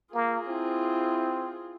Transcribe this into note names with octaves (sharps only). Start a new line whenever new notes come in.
A#3 F4 G#4
C4 E4